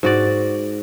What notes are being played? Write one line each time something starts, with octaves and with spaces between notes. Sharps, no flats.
G#2 F#4 D5